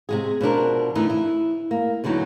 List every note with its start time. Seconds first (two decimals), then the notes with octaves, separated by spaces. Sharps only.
0.09 C3 G#3 G#4
0.41 B2 F3 D4 A#4
0.95 D3 E3 A3 D#4 E4
1.10 E4
1.71 A#3
2.04 E2 D3 E3 F#3 D#4